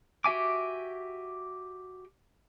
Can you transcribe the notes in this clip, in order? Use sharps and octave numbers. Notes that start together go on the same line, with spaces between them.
F#4 G4 E5 G#5 D6